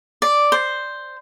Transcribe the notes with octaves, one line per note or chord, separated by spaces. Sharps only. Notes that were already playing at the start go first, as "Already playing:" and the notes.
D5
C5